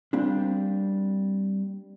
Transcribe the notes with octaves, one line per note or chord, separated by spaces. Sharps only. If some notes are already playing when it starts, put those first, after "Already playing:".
G3 A#3 C4 D4